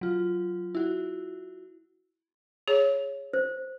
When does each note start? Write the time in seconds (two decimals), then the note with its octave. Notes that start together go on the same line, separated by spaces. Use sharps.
0.01 F#3 F4
0.75 E4 F#4
2.68 G#4 C#5
3.33 C5